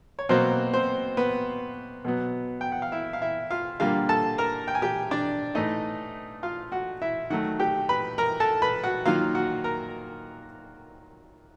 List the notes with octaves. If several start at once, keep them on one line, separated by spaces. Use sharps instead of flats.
C#5
B2 F#3 A#3 C4 C5
C4 C5
B3 B4
B2 F#3 B3
G5
F#5
F5
E4 E5
F5
E4 E5
F4 F5
D3 G3 A#3 F4 F5
A4 A5
A#4 A#5
G5
G#5
G4 G5
D4 D5
A2 E3 A3 D#4 D#5
F4 F5
F#4 F#5
E4 E5
D#3 F#3 A3 F#4 F#5
G4 G5
B4 B5
A#4 A#5
A4 A5
B4 B5
F#4 F#5
D#3 F#3 A#3 F4 F5
F#4 F#5
A#4 A#5